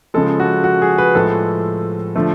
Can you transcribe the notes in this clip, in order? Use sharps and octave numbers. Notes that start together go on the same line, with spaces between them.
C#3 F3 G#3 A4
F#4
F#4
G#4
B4
A2 F3 G#3 A4
D3 F3 A3